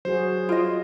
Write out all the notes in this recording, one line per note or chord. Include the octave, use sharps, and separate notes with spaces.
F#3 F#4 G#4 C5
F4 D#5